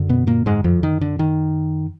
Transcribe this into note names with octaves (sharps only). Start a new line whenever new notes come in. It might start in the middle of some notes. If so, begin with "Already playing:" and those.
Already playing: F#2 D3
B2 B3
A#2 A#3
G#2 G#3
F2 F3
D#3
D3
D#3